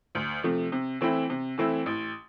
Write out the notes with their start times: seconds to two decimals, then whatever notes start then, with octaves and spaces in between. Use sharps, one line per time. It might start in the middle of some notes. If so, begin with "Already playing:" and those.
0.15 D2
0.43 C3 F3 A3
0.72 C3
1.01 E3 A3 C4 E4
1.30 C3
1.58 E3 A3 C4 E4
1.86 A1